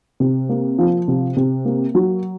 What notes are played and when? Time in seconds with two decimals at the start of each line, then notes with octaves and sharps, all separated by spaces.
0.20 C3
0.49 A#3
0.78 F3
1.08 C3
1.37 C3
1.65 A#3
1.95 F#3